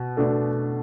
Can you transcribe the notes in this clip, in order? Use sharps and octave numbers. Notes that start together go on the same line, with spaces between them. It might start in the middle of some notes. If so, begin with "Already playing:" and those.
Already playing: B2
B2 A3 D4